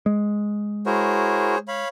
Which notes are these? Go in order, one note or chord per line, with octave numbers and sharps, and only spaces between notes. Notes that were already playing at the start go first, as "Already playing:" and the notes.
G#3
E4 F#4 G#4 A#4 C5 C#5
C#5 F5 B5